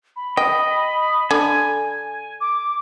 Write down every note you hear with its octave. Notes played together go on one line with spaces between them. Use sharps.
B5
D#5 G5
D3 G#5
D6